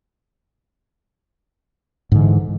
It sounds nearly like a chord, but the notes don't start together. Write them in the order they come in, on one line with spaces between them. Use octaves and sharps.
G#2 D3 E3